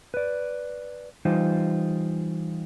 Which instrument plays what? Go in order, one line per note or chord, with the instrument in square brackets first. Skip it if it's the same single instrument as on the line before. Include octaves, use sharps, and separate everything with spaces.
[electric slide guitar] B4 D5
E3 G3 D#4 F4 C5